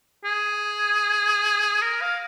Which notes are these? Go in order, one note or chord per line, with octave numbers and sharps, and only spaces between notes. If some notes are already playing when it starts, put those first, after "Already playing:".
G#4
A#4
F5